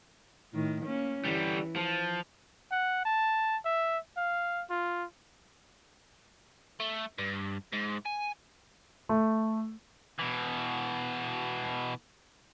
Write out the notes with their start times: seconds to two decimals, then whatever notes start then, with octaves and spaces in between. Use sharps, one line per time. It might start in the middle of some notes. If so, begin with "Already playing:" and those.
0.54 A2 D#3
0.85 A#3 C#4
1.25 D3 E3 G3
1.76 F3
2.72 F#5
3.05 A5
3.65 E5
4.17 F5
4.70 F4
6.80 A3
7.18 G2
7.73 G#2
8.06 G#5
9.09 A3
10.20 B2 E3